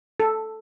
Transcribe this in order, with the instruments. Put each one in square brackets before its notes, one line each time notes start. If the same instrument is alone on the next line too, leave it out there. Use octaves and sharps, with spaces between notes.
[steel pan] A4